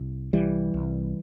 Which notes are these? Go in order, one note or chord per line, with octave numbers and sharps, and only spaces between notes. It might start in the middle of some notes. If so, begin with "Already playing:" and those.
Already playing: C2
C2 E3 G3
C2